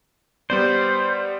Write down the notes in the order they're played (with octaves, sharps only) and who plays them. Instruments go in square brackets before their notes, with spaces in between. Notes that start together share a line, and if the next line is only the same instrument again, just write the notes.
[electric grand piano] G3 B3 D5 [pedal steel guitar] C5